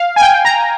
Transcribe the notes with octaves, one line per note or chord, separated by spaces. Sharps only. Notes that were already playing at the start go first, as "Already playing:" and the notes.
Already playing: F5
G#5
G5
A#5